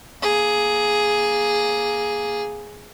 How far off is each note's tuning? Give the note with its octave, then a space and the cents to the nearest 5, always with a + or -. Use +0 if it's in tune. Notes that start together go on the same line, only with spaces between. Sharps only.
A#3 +5 G#4 +5